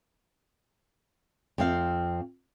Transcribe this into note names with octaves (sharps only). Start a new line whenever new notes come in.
F2 C4 F5